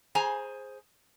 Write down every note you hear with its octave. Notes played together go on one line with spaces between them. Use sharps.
G#4 C5 G#5 A#5